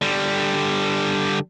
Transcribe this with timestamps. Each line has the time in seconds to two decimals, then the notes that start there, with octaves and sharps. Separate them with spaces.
0.01 D3 G3